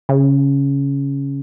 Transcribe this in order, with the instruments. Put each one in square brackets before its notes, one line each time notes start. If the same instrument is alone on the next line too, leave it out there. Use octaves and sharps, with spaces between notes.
[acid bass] C#3